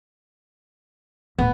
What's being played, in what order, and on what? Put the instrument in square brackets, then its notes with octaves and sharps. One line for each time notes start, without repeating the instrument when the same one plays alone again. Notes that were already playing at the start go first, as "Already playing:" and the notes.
[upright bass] D1 [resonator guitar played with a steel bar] B3